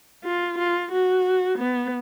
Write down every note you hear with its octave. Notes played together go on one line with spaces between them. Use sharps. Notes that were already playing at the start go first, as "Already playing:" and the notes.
F4
F4
F#4
B3